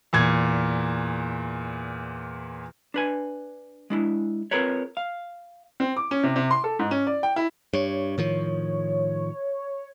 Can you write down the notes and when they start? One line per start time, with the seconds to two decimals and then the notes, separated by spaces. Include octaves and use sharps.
0.13 E2 A#2 G#6
2.94 D4 B4 G#5
3.90 G#3 D4 E4
4.51 C4 F4 G#4 A#4 B4 C#5
4.97 F5
5.80 C4
5.97 D6
6.11 C#4
6.23 C3
6.36 C3
6.51 C6
6.64 A4
6.79 G#2
6.91 C#4
7.07 D5
7.23 G5
7.36 E4
7.73 G2 C#5
8.18 A2 D#3 F3